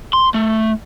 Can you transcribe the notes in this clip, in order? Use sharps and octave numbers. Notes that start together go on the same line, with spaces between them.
C6
A3